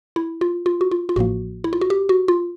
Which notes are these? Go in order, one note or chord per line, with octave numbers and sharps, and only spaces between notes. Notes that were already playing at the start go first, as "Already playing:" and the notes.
E4
F4
F4
F#4
F4
F4
A1 A2 F3 A#3 F#4
E4
F4
F#4
G4
F#4
F4